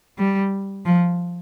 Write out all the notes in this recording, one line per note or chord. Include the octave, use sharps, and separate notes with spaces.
G3
F3